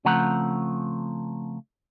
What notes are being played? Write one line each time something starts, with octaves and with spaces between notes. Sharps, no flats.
C#3 F3 A3 C4 F#5 A#5